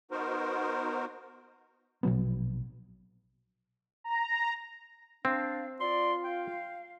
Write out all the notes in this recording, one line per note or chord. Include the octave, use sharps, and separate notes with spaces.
B3 D#4 F#4 A#4 C5
A#1 B2 F#3 B3
A#5
C4 D4 F5
F4 D5 C6
F5 G5